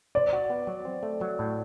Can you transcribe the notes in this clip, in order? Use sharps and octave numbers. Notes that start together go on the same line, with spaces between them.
C5 D5
F#4
B3
F#3
C4
A3
F#3
A2